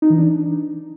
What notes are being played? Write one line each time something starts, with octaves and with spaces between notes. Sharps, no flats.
D#4
E3
D4